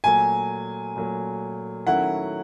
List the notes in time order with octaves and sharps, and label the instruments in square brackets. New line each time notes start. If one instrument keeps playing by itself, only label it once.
[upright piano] A#2 F#3 A3 [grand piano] G#5
[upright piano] A#2 F#3 A3
[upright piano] D#3 F#3 A3 C#4 E4 [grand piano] F#5